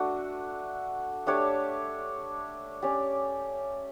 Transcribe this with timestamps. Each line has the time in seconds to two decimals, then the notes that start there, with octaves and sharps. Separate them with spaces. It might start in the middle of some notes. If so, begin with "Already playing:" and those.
Already playing: A3 D4 F#4
1.27 A3 D4 G4 C#5
2.82 C#4 G4 D5